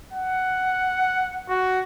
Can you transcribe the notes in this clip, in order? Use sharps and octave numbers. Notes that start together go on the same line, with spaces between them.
F#5
F#4